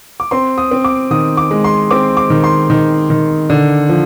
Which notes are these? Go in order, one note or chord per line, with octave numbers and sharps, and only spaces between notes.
D6
C4 C6
D#6
C4
D6
D#3 D#6
D6
G#3
C6
C4 D6
D6
D#3
C6
D#3
D#3
D3
F3